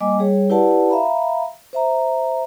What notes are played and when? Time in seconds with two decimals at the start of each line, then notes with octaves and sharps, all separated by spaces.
0.01 G3 A#3 D#5 G#5 D6
0.19 G3 G#4 C#5
0.50 E4 G4 B4 D5 F#5 A5
0.90 E5 F5 A#5 B5
1.73 C5 E5 A#5